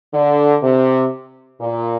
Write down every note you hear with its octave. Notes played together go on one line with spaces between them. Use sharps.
D3
C3
A#2